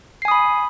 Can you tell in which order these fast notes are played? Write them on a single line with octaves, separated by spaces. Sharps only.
C7 G#5 D#6 B5